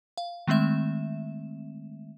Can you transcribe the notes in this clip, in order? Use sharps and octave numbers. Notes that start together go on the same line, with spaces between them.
F5
D#3 G#3 A3 C4 E5 E7